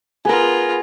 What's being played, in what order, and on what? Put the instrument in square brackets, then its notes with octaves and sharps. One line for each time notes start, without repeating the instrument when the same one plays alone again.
[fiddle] B3 F4 [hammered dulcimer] G#4 A#4